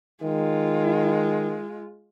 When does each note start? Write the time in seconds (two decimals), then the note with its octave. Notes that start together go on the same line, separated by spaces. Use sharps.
0.24 D#3 G#3 F4